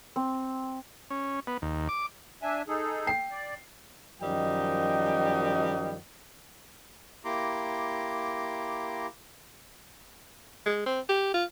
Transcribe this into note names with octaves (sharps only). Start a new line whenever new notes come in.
C4
C#4
B3
D#2
D6
D4 E5 G#5
D#4 G#4 A4
G5 C7
D5
F#2 D#3 F3 G3 D#5 G5
A#3 E4 G4 A#5 C6 D6
G#3
C4
G4
F4